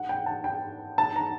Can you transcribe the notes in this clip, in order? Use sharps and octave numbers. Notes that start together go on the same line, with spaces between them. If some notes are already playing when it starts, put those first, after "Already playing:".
Already playing: F#5
G5
A5
G5
A5
A#5